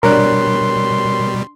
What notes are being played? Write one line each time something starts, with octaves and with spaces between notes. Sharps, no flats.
B2 G3 D4 A#4 C#5 D5 C6 F#6